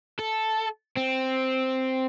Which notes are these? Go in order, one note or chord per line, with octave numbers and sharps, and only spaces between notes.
A4
C4